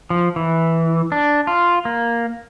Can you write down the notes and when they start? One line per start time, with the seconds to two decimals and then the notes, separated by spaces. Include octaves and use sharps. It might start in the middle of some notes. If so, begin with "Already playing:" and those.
0.10 F3
0.36 E3
1.12 D4
1.47 F4
1.85 A#3